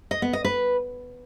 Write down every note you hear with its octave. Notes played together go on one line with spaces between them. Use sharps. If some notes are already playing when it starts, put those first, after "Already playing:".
D#5
B3
D#5
B4